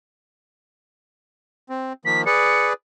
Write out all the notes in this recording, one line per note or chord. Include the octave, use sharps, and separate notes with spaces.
C4
D#3 F3 A#3 B6
G#4 B4 D5 C#7